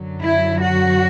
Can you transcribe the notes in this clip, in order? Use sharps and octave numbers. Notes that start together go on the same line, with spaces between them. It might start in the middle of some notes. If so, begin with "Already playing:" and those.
Already playing: F#2 D3 F#3
E4
F#4